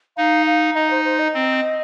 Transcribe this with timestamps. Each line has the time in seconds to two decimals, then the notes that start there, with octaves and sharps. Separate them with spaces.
0.17 D#4 F5
0.46 F5
0.75 D#4 D#5
0.90 C5
1.05 C5
1.19 D#5
1.34 C4